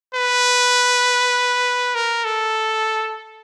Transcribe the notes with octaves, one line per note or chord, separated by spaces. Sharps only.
B4
A#4
A4